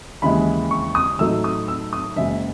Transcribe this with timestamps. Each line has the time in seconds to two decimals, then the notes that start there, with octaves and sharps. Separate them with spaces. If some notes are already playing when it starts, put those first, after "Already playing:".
0.22 D#2 C#3 E3 G#3 B5
0.71 C#6
0.95 D#6
1.19 A2 F#3 A3 D#4 E6
1.44 D#6
1.68 E6
1.93 D#6
2.16 F#1 F#2 C#3 G#3 E5